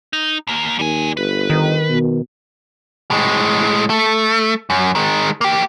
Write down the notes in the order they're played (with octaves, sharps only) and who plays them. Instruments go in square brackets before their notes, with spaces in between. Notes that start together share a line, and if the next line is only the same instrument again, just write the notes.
[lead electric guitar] D#4
D#2 A#3
[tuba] D#2 [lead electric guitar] G3 G#5
[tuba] G1 [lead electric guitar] B4
[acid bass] D#3
[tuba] B2
[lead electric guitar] A2 G#3
A3
F#2
D#3 G#3
A#3 G4